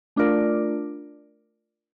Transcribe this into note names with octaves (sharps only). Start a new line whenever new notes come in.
A3 D4 F4 A#4 D5